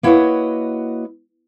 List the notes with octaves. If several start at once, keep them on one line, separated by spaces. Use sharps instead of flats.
A#3 E4 F#4 B4 C#5 D#5